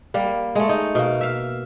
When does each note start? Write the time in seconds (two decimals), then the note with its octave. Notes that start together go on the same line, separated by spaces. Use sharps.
0.14 G3 A#3
0.55 G#3 A3
0.69 D#4
0.95 B2 A#3
1.21 E5 F5